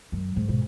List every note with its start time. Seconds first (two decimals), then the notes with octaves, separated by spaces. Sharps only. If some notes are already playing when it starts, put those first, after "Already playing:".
0.12 F#2
0.36 G#2
0.49 B2